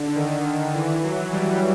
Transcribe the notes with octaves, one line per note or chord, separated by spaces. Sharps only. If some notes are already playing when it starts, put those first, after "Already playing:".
Already playing: D3
D#3
E3
F#3
G3